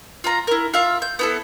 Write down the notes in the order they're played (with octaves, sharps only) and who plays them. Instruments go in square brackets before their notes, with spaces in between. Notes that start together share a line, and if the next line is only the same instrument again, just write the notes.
[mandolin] F4 F5 A#5
E4 A#4
F4 E5 F5
G6
B3 E4 A4